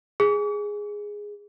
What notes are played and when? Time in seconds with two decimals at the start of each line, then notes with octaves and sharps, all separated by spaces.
0.20 G#4